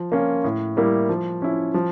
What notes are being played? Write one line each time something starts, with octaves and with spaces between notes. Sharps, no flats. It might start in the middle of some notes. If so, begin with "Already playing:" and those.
Already playing: F3
A#3 C#4 F4
A2
G3 A#3 E4
F3
C#4 E4
F3